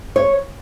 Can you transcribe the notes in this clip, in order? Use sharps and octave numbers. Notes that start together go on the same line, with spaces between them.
C#5